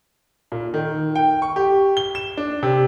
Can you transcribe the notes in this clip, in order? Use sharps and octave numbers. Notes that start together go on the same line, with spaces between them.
A#2
D#3
G5
C#6
G4
G7
E7
D4
C3